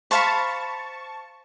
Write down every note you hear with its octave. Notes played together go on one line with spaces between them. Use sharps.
C5 F5 A5 B5 C#6